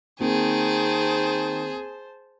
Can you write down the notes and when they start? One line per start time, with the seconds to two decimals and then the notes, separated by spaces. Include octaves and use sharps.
0.20 D#3 A#3 C4 G#4 C5 A5